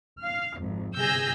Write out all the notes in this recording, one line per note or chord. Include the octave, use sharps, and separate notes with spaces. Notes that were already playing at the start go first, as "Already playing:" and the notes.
F5 F6
G#1 F2
G1 C3 G#4 E6 G6 A#6